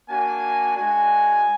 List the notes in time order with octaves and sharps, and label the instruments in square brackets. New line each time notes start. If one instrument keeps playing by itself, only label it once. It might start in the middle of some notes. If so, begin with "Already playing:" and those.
[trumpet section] A#3 D4 F#4 G#5
G#3 D4 F#4 G#5